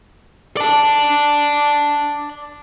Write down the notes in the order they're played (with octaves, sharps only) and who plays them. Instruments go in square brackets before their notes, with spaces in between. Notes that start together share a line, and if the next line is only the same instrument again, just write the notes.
[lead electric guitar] D5 A5